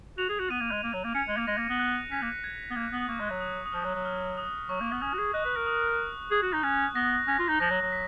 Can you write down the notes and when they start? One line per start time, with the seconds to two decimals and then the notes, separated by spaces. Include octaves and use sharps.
0.18 F#4 F7
0.29 G#4
0.39 F#4
0.50 B3 D#7
0.61 A#3
0.71 G#3
0.83 A#3
0.93 F#3
1.04 A#3
1.15 C#4 C#7
1.28 G#3
1.37 A#3
1.47 G#3 A#6
1.58 A#3
1.69 B3
1.79 F#6
2.11 C#4 B6
2.22 A#3
2.44 G#6
2.70 B3
2.76 A#3 G#6
2.87 F#6
2.92 B3
2.97 D#6
3.08 A#3 C#6
3.20 G#3
3.30 F#3
3.40 D#6
3.66 D#6
3.72 F3 F6
3.84 F#3
3.95 F#3
4.05 F6
4.37 D#6
4.69 F#3 C#6
4.80 A#3
4.91 B3
5.02 C#4 D#6
5.13 F#4
5.18 G#4
5.34 D#5 F#6
5.45 B4
5.56 A#4
5.66 D#6
5.88 F#6
6.31 G#4
6.42 F#4
6.53 D#4
6.63 C#4 F#6
6.95 B3 A#6
7.27 C#4 A#6
7.39 F4
7.49 D#4
7.60 F3 A#6
7.70 F#3
7.82 F#3
7.92 B6